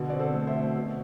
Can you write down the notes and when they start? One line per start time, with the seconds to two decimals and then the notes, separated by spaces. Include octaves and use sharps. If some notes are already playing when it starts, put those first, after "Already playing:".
Already playing: B2 D3
0.10 C4 D5
0.19 A4 C5
0.34 A3
0.47 C5 E5
0.55 B2
0.76 B2